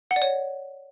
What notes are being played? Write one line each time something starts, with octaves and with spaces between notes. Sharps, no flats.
F#5
D5
C#5